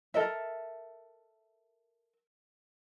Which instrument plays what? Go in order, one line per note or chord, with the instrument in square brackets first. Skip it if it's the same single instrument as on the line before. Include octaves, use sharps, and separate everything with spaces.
[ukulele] A4 A#4 D#5 E5